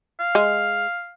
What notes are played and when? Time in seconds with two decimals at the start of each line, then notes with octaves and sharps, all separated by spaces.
0.20 F5
0.35 G#3